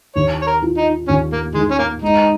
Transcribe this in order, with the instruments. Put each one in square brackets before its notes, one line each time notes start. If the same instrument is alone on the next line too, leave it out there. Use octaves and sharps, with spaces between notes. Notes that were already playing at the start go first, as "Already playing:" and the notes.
[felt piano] D#2 [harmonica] C#5
[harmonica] C#5
A#4
[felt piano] F4
[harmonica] D#4
[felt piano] D#2 [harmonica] C#4
[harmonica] A#3
[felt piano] D#3 [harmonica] G#3
[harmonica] C#4
A#3
[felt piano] G#3 [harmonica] D#4